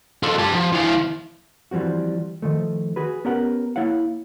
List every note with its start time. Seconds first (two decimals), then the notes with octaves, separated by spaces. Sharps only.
0.23 F4 A4
0.38 G4 A5
0.53 F3
0.73 E3 F5
1.71 E3 F3 G3 C4 F#4
2.42 D#3 F3 A3
2.96 F#4 G#4 B4
3.25 B3 C#4 G4 A#4 B4 F#5
3.76 A#3 E4 C#5 F5 F#5